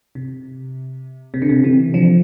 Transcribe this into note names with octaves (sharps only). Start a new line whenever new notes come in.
C3
C3
D3
C3
C3 E3
D3 F3